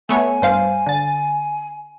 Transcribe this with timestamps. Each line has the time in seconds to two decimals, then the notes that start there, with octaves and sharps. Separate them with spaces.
0.09 A3 B3 C#5 G#5
0.42 G2 C5 F5
0.86 D3 A6